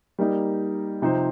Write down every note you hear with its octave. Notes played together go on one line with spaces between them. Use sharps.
G3 A#3 D#4
C3 F3 D#4 C5